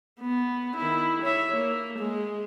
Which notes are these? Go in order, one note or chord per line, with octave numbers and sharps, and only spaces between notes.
B3
D#3 E4
C#5 E5
A#3
G#3